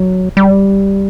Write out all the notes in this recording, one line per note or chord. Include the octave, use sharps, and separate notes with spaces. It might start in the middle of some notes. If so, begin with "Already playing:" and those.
Already playing: F#3
G3